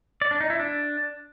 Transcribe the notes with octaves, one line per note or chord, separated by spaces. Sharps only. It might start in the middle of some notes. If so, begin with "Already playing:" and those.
D5
D4
D#4
E4
D4